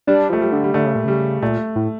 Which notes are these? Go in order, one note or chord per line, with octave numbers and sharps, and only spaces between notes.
G3 D4
F3 A3
G3
D3
G3
D3 A3
C#3
A#2
C#3 G3
A#2 A3
A2